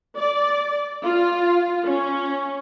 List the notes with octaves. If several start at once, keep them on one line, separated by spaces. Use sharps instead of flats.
D5
F4
C#4